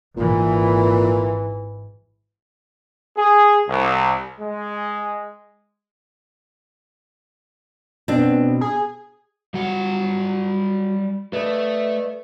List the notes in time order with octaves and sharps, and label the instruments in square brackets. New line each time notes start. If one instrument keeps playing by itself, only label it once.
[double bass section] G#1 E3 [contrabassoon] A#2
[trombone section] G#4
C2
G#3
[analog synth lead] B2 [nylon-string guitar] C4 D4
[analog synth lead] G#4
[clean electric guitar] F#3 [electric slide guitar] G3 F#5
[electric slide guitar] A3 [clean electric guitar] B4 D5 D#5